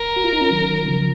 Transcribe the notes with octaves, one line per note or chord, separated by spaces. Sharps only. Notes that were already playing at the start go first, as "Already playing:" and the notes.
Already playing: A#4
F#4
F4
D#4
C#4 F4
D#3 F#3
C#3 F3